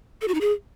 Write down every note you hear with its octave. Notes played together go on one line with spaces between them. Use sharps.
A4
F#4
D#4
G#4